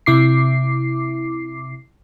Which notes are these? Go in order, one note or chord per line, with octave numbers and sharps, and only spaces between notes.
C3 E4 D6 C7